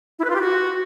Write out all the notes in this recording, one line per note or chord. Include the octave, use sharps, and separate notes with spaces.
E4
B4
F4
G4
F#4